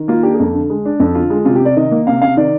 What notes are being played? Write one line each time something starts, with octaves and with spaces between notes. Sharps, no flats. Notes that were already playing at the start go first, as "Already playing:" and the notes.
Already playing: D#3
A#3 F4
D4 G4
G#4
F2
D3
G#3
D4
F2
D3 F4
G#3
C3 F4
G4
C3
D5
D#3 D#5
A#3
C3 F5
C3 F5
D#3 D5